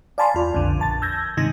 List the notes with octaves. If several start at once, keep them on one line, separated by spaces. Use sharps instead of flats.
D5 F5 G#5 A5 B5 C6
E2 F4
B1 F2 D3
A#1 A5 A6
E6 G6 G#6 A#6
G#2 C3 D#3 D#4 G#6 A#6